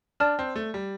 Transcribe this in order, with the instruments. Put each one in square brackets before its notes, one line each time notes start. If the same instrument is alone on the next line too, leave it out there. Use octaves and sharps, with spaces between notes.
[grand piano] D4 [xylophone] D5 A5 F6
[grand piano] C4
A3
G3